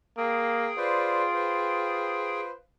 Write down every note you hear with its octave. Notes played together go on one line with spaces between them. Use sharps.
A#3 G#4 G5
F4 B4 C5 D5
B4 C5